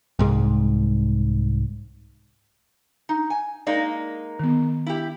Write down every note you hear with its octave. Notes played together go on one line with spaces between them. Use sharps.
C2 G#2 G#3
D#4
G#5
G#3 A#3 D#4 D5
D#3 B3
E4 G4